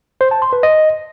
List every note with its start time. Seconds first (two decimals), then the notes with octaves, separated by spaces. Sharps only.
0.21 C5
0.31 A5
0.42 C6
0.53 B4
0.63 D#5